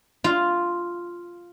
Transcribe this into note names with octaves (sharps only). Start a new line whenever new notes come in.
F4